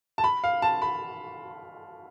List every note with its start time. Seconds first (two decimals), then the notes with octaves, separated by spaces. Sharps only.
0.18 A5
0.24 B5
0.44 F5
0.62 A5
0.82 B5